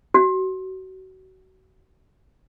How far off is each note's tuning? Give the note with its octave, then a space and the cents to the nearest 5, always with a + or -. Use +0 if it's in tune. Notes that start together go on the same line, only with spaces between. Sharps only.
F#4 +30